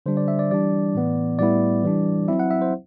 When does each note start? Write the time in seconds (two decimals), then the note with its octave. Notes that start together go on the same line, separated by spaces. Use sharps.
0.06 D3 G3 D4 C5
0.17 D5
0.28 E5
0.39 D5
0.51 E3 G3 D4 D5
0.95 A2 E3 B3
1.39 A2 G3 B3 E4 D5
1.84 E3 G3 D4
2.28 F#3 C4 E4 E5
2.40 F#5
2.51 E5
2.62 C5